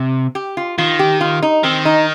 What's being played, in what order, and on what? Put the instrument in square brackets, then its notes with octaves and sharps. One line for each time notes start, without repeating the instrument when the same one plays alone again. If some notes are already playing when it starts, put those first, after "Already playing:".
Already playing: [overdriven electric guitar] C3
[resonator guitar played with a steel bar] G4
F4
[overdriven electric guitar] D#3 [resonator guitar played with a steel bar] F4
[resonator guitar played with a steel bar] G4
F4
D#4
[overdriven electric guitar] D#3 [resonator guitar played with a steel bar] C4
[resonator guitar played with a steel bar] D#4